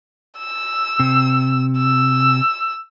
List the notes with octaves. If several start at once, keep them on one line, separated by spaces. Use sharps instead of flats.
E6
C3
E6